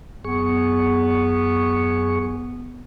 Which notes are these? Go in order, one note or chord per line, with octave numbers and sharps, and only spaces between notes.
F#2 B3 G#4 C#6